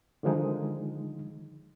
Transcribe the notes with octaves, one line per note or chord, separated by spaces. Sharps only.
D3 D#3 F3 G#3 D#4